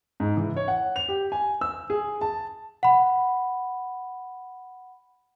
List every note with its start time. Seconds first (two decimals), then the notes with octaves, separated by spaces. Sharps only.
0.20 G#2
0.37 E3
0.57 C#5
0.68 F#5
0.96 F7
1.09 G4
1.32 G#5
1.61 E6
1.90 G#4
2.21 A5
2.83 F#5 B5